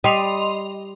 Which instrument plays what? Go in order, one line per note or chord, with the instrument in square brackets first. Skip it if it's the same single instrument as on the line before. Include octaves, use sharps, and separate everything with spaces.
[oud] G3 [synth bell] D#5 C6 F7